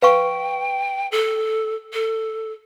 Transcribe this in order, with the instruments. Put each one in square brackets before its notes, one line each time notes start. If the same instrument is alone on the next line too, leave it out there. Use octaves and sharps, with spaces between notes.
[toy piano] B4 F5 C#6 [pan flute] G5
[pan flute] A4
A4